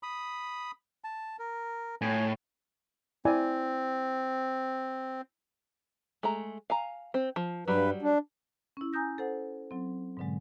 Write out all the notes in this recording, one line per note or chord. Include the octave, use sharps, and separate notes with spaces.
B5 D#6
A5
A#4
A2 G#5
C4 E4 D5 G#5
G#3 A3 A#5
F5 G#5 A#5
C4
F3
G2 F#3 G3 B4
D4
C#4 E4
G#5 A#5 D#6 G6 A#6
A4 C5 F#5
F#3 C4
G#2 B2 D3 F#3 G#3